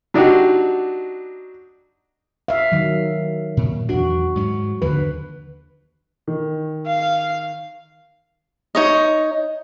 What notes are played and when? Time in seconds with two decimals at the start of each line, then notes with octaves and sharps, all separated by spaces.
0.14 F#3 D4 D#4 F#4 G4
2.48 E5 F5
2.72 D#3 F#3
3.57 A#2
3.89 E2 D4 F#4
4.35 G#2 F#3
4.82 D#2 D3 F3 B4
6.27 D#3
6.86 F5
8.75 D#4 C#5 D#5